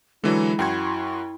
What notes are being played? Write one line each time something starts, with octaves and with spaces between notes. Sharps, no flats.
D3 E3 F#3 G#3 E4
F#2 F#4 G5 C6 C#6 G#6